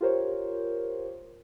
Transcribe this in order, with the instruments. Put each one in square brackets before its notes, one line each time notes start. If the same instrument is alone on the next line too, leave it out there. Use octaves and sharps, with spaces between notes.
[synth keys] F4 G4 A#4 C5 C#5